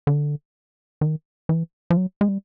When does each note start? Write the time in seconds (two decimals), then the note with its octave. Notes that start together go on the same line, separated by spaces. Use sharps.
0.07 D3
1.01 D#3
1.49 E3
1.90 F3
1.97 F#3
2.21 G#3
2.29 G3